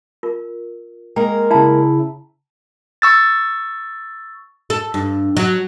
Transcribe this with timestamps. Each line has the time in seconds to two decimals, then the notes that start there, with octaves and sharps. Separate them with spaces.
0.23 F4 A#4
1.16 G#3 A#3 A#4 G5
1.51 C#3 E4 G5 A5 A#5
3.02 C#6 E6 A6
4.70 A4
4.94 G2
5.37 F#3